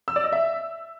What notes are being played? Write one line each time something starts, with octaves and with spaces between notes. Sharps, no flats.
E6
D5
D#5
E5